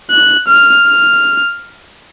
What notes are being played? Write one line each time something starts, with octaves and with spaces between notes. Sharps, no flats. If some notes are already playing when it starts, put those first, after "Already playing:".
F#6
F6
F6